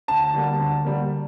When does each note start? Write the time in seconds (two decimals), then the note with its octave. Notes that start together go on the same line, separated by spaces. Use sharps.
0.08 D2 A5
0.34 D3 G3 A#3
0.59 D2
0.85 D3 G3 A#3